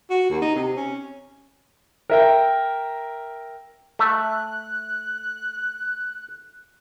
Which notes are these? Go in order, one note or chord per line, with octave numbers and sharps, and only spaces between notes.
F#4
D#2
D#4
C3
C#4
A#4 E5 G5
A3 E5 F#6